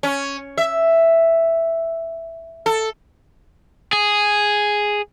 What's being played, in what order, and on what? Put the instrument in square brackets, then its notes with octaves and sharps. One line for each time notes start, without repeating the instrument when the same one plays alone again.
[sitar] C#4
E5
A4
[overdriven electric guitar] G#4